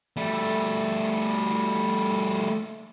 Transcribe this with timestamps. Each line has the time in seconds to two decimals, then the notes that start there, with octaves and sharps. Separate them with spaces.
0.17 G3 A3